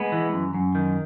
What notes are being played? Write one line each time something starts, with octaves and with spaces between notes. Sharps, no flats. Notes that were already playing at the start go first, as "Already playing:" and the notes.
Already playing: G#3 B3
E3
F#2
F#2
D#3